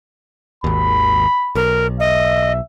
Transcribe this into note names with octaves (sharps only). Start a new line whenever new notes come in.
G#1 D#2 B5
B1 A#4
D#5 E5